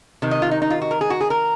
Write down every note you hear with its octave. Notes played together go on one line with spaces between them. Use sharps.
C3 D#3
D#5
F4
D#4
D#4
F4
F#4
A#4
G#4
F#4
G#4
A#4